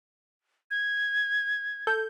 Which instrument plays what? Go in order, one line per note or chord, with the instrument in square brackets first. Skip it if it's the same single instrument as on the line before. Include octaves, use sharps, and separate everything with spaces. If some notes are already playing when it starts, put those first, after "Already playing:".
[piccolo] G#6
[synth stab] A4 G6